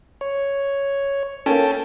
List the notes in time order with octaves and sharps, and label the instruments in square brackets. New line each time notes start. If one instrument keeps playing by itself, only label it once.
[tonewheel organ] C#5
[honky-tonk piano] A#3 C#4 [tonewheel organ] A4 G5 A5